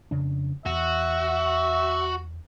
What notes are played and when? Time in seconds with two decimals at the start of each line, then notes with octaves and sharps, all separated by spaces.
0.11 F2 C#3 D4
0.66 E2 F#4 E5